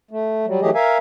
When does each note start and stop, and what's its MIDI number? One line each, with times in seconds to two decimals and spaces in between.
0.11 0.46 57
0.47 0.61 54
0.47 0.61 55
0.61 0.70 52
0.61 0.70 54
0.61 0.70 57
0.61 0.70 67
0.61 0.70 68
0.61 0.70 75
0.75 0.98 70
0.75 0.98 76
0.75 0.98 77
0.75 0.98 80